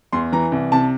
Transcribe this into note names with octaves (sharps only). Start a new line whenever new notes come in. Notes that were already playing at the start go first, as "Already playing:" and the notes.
E2 C6
E3 A#5
C2
C3 A5